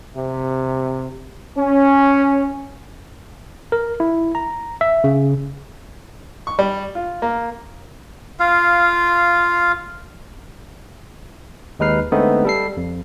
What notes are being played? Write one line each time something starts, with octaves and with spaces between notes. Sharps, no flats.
C3
C#4
A#4
E4
A#5
E5
C#3
C#6
G3
F4
A#3
F4 F5
D#2 G#3 D#4 B4 F6 C7
D3 G#3 A3 B3 C4 D#4
G3 A4 C7
F2